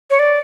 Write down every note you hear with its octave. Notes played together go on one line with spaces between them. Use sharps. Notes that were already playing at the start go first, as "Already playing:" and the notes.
C#5
D5